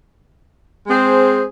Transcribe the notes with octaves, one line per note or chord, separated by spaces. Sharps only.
G#3 C4 G#4 C5